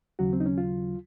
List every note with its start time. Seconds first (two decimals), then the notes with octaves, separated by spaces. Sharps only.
0.19 D#2 C#3 F#3 F#4
0.33 C4
0.40 D#4
0.46 C#4
0.58 F4